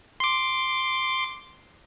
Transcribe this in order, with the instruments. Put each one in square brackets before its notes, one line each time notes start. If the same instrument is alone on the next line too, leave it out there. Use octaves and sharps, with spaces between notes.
[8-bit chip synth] C6 D6